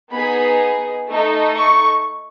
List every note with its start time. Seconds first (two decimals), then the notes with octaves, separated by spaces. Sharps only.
0.12 B3 D#4 G#4 B5
1.09 A3 D#4 A4
1.56 C#6